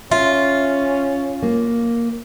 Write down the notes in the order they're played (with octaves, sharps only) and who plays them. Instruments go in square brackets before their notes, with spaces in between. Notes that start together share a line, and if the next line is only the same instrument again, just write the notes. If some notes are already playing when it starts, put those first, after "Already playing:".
[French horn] C#4 [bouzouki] F4 [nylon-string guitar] E5
[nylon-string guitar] A#3